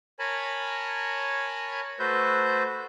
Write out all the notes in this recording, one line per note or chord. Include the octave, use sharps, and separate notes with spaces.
A#4 C#5 G#5 A5 B5
A3 F#4 B4 C5 E5 G6